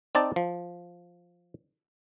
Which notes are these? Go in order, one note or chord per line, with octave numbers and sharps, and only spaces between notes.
C4 D#4 D5 A5
F3